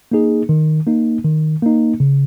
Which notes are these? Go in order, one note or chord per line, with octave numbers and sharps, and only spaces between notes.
A#3 D#4 G#4
D#3
A#3 D#4
D#3
A#3 D#4
C#3